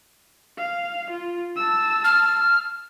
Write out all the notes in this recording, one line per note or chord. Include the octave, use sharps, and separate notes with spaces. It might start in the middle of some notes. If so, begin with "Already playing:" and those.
F5
F4
A5 E6
F6